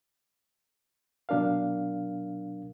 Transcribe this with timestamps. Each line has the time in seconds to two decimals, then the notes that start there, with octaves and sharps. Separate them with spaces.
1.29 B2 F#3 D4 A#4 F5